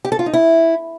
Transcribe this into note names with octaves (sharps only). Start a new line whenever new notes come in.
G4
A4
F4
D#4
E4